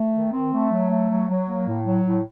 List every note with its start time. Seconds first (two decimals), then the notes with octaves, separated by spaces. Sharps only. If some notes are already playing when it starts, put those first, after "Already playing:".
Already playing: A3
0.12 D#3
0.31 C4
0.51 A3
0.70 F#3
0.89 A3
1.09 F#3
1.27 F#3
1.48 A#3
1.67 A2
1.85 F#3
2.04 A2